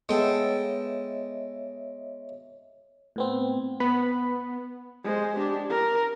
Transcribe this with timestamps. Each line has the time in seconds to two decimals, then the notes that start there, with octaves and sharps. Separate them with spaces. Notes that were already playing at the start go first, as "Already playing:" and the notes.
0.09 G#3 B3 A4 C#5 D#5 E5 G5
3.16 A2 B3 C4
3.80 B3 B5
5.04 G#3 C5
5.36 D4 G4
5.70 A#4